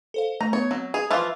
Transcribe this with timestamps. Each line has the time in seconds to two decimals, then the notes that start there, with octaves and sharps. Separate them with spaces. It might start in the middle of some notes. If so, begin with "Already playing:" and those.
0.14 A4 C5 F5
0.41 A3 A#5
0.53 B3 C#5
0.71 F#3 C4
0.94 G#4 F7
1.11 E3 F3 F4